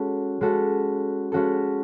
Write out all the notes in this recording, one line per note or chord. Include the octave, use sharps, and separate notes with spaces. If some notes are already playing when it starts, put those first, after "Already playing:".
Already playing: G#3 C#4 F#4 A4
G#3 C#4 F#4 A4
G#3 C#4 F#4 A4